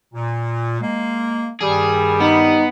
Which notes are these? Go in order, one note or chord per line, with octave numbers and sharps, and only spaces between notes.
A#2
G#3 A#3
G2 D#3 G3 G#4
B3 D#4